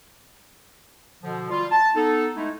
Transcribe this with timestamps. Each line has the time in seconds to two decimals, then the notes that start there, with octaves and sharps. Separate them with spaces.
1.23 B2 D3 F3
1.50 G3 F4
1.71 A5
1.95 B3 D#4 A4
2.35 G#3 A3 D#4 E4